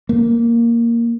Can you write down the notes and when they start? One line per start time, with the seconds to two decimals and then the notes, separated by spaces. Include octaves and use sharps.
0.09 A#3